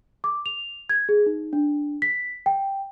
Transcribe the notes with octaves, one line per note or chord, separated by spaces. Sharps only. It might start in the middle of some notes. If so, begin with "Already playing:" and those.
D6
F7
G#6
G#4
D#4
D4
B6
G5